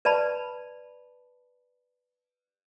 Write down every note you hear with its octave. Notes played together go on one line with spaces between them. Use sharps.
B4 D5 A5 B5